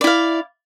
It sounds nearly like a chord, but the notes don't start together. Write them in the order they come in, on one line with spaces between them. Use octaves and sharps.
D5 E4 F5